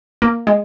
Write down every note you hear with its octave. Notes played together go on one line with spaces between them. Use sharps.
A#3
G#3